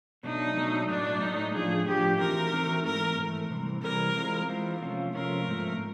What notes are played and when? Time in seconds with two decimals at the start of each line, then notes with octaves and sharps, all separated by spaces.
0.23 B2 F#3 A3 D4 D#4
0.57 B2 F#3 A3 D4
0.89 A2 F#3 A3 D4
1.22 A2 F#3 A3 D#4
1.54 A2 F3 A3 D4 F4 G#4
1.87 A2 F3 A3 D4 F4 G4
2.20 E3 A3 C4 D#4 F#4 A#4
2.53 E3 A3 C4 D#4 F#4
2.85 G#2 E3 A3 A#4
3.18 G#2 E3 A3
3.50 C3 E3 G3 C4
3.83 C3 E3 G3 C4 A#4
4.16 E3 G#3 C4 F4
4.48 E3 G#3 C4 F4
4.81 C3 F3 A3 C#4 F4
5.14 C3 F3 A3 C#4 F4 A#4
5.47 G#2 F3 A3